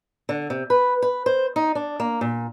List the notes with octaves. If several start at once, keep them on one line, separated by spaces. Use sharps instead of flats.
D3
C3
B4
B4
C5
D#4
D4
A#3
A#2